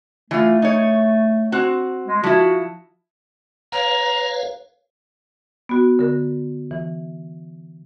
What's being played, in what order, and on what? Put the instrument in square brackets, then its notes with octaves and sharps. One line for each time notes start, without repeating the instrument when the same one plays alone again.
[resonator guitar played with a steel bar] E3 F4 [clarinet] A3
[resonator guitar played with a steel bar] D#4 C#5
C4 F#4
[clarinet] G#3
[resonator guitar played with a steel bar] F3 E4 [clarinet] F#4
[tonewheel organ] B4 C#5 F5 [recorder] A#5
[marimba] B3 F#4
D3 A#4
E3